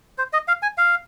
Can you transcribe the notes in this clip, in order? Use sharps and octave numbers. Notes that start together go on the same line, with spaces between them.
C5
D#5
F5
G#5
F5